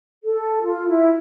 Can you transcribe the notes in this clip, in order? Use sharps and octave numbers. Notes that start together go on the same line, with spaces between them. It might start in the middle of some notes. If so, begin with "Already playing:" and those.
A4
F4
E4